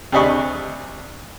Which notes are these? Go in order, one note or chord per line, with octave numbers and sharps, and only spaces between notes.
D2 C3 D4 D#5 B5 C#6